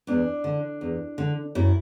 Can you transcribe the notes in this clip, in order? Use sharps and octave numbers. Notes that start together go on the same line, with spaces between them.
E2 D4
D3
E2
D3
F#2 E4